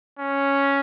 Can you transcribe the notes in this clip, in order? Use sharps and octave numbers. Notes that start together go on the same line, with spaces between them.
C#4